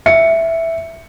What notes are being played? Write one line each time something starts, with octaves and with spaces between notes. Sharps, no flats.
E5 C#7